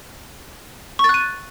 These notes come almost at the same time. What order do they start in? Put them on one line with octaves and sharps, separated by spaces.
C#6 A6 F#6 D#7